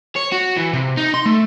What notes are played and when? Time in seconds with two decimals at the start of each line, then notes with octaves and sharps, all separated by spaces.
0.16 C#5
0.32 F#4
0.57 E3
0.73 C3
0.97 D#4
1.14 C6
1.26 A3